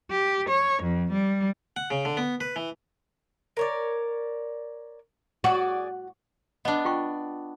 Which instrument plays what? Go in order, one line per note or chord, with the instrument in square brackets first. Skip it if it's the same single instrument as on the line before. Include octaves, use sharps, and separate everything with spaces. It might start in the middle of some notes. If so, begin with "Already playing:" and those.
[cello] G4
C#5
F2
G3
[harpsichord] F#5
C#3
D3
B3
B4
E3
[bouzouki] A#4 C#5 D5
[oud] F#4 [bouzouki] G#4 D5
[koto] B3 D4 [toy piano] D#5
[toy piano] F4 G5 C#6